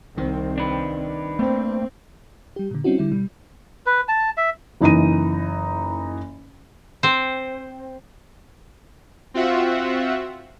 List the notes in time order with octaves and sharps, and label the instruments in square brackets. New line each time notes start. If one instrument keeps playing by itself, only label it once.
[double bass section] C2 C4 [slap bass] D#3
[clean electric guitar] D4 B4
[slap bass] A3 A#3 [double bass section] C4
[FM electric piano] G3 G4
A#2 D3
G3 C4 C#4 D#4 E4 F#4
D3 G3 E4
B2 G3
[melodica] B4
A5
E5
[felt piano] F#1 E3 D#4 A#5 D#7
[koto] C4 C5
[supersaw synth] C4 F4 F#4 E5 F#5